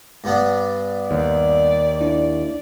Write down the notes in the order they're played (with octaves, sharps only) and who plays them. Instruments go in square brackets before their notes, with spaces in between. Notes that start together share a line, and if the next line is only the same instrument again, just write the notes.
[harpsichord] G2 B3 D4
[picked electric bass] D#2 [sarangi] D5
[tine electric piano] D4 E4